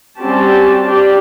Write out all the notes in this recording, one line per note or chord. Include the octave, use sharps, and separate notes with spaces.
G3 C4 C#4 F#4 G4 A5
D4 G4 D5